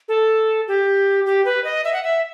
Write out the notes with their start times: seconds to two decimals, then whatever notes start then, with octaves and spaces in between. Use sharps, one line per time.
0.08 A4
0.68 G4
1.26 G4
1.45 B4
1.64 D#5
1.84 E5
1.93 F#5
2.03 E5